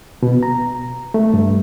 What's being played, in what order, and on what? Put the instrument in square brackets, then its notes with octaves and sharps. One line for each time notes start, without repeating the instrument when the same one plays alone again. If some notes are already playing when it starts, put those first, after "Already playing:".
[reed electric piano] B2
A#5
A3
G2